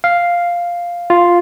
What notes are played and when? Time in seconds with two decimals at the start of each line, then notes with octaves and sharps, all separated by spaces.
0.04 F5
1.10 F4